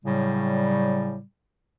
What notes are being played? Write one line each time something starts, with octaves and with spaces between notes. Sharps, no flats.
A2 C#3 F#3 G3